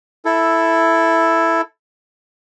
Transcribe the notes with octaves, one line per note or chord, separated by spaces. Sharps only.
E4 A4